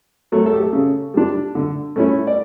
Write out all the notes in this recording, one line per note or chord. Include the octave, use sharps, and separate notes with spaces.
F#3 A3
A4
G4
A4
C#3
G3 D4
D3
A3 C#4 E4
D5